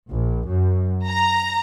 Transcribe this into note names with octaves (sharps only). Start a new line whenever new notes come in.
A#1
F#2
A#5